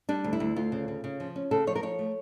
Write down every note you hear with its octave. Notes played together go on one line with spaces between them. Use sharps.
G3 D4
D2
E4
D2
D2 F4
C#3
C#3
C#3
F3
C#4
C#3 A4
F3 C#5
A#4
F3 C#5
A3